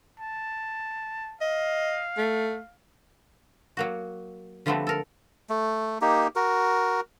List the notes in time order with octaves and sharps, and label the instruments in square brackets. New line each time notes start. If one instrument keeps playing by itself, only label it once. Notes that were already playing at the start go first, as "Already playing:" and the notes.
[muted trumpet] A5
[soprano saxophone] D#5 [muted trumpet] F5
[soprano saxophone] A3
[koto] F#3 A#3 F#4
D3 F3 G3 A3 B3 C4
A4 A#4
[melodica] A3
A#3 D#4 G4
F#4 A#4